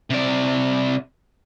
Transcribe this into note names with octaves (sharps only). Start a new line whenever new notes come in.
C3 D5